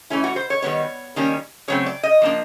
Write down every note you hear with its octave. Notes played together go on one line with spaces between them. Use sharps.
E3 A3 C#4 E4
F#4
C5
C#5
D#3 G3 B3 C#5
D#3 G3 A#3 C#4
C#3 F#3 A3 C4 C#5
D5
D#5
F3 A#3 D4